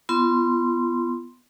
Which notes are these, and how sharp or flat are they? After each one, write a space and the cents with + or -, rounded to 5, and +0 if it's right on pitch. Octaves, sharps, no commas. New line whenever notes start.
B3 +5 F4 -40 C6 +0